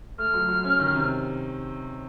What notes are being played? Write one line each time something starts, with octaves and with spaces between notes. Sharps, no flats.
A3 F6
F#3
F#3
C#4
D#3
C3